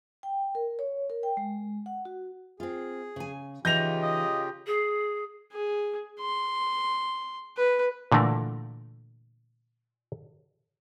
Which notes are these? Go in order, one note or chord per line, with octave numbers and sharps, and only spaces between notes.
G5
A#4
C#5
A#4
G5
G#3
F#5
F#4
C4 F4 G#4
C#3 G#5
C#3 E3 D#4 F4 G4 G6 A#6 F7
D#5
G#4
G#4
C6
B4
A#2 D3 E3 A3 A#4